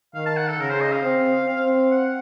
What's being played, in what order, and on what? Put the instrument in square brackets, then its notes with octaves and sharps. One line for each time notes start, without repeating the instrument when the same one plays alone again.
[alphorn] D#3 [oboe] F5
[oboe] A5
F#5
A4
[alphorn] C#3 [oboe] A#4
[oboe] C5
D#5
F5
[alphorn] C4
C4
[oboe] F#5